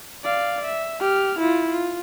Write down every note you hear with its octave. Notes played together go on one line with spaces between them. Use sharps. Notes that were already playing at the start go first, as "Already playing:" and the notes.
D5 F5
E5
G4 F6
E4 F4
F4